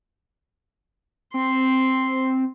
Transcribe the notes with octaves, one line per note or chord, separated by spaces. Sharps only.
C4 C6